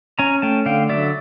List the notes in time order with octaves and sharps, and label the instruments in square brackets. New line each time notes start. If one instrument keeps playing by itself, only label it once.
[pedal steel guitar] C#4 G#5 A#5
A3 G5 A5
D3 F5 G5
F#3 D5 E5